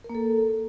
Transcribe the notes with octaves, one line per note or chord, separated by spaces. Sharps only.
A#4
A#3
A4